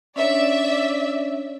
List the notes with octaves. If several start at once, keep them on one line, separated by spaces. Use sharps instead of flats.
C#4 D4 C#5 D5 E5